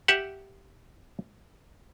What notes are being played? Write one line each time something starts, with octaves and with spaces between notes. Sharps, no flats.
G4 E5 F#5